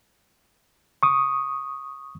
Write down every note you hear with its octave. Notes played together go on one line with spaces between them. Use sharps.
C#6 D#6